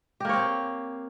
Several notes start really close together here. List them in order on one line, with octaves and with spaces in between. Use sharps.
G4 A#3 C#5 C4